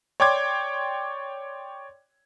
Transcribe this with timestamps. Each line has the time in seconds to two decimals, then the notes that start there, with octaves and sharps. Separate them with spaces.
0.20 C#5 D5 G5 C6 D6 G#6